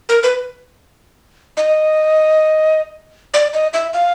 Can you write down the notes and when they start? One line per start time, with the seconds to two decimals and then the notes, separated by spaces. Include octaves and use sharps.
0.09 A#4
0.23 B4
1.57 D#5
3.34 D5
3.54 D#5
3.73 E5
3.94 F5